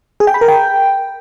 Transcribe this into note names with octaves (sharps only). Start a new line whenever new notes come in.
G#4
G5
B5
A#4
G5